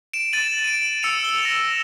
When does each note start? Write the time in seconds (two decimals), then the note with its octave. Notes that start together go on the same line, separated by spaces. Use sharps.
0.13 D7 E7
0.33 A6 D#7 F#7
0.64 D7 D#7
1.03 E6 C#7 F7
1.24 G7
1.42 A#6 E7